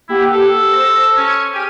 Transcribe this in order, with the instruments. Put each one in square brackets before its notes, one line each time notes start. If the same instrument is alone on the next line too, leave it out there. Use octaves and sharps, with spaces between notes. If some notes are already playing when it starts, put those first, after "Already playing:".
[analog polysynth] A#3 G4 F#5 [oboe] E4
[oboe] A4
[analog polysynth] C5 A#6 E7
[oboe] C#4 [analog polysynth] G#6 C#7
[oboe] G4 [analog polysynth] G#4 F6 D#7